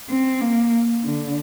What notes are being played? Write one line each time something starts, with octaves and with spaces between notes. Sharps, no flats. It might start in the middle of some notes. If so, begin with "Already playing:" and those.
C4
A#3
D3